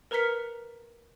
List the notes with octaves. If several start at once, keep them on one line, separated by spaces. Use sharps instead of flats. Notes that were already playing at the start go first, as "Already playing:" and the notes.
A#4 B4 A#5 F6 B6 C#7